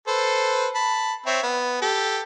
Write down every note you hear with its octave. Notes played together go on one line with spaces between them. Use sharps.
A4 B4 C5
A5 B5
C4 C#5 E5
B3
G4 A4